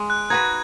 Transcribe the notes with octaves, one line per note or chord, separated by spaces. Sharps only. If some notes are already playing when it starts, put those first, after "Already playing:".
Already playing: G#3
F#6
D#4 F#4 B4 G#6